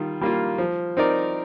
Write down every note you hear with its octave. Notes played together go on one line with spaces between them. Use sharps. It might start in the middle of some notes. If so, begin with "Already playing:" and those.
Already playing: D#3 G3 F4
G3 A#3 F4
F3
C4 D#4 A#4 D5